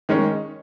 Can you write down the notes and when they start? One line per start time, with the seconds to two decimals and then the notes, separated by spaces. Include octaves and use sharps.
0.09 D#3 G#3 C#4